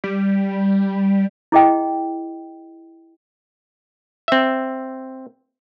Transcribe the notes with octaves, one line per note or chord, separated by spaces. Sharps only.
G3
E4 G#4 D#5 G5
C4 E5